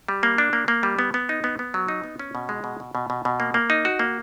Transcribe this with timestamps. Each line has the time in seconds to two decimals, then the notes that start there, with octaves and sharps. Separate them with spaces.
0.08 G3
0.23 A#3
0.38 D4
0.53 A#3
0.68 A#3
0.83 G3
0.99 B3
1.14 B3
1.29 D#4
1.44 B3
1.59 B3
1.74 F#3
1.88 D#4
2.04 B3
2.19 C#4
2.35 B2
2.49 G#3
2.64 B2
2.80 B2
2.95 B2
3.10 B2
3.25 B2
3.40 A#3
3.54 A#3
3.70 D#4
3.85 F#4
3.99 A#3